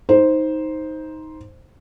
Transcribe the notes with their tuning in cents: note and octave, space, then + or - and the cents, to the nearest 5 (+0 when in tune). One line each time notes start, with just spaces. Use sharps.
D#4 +15 C5 +0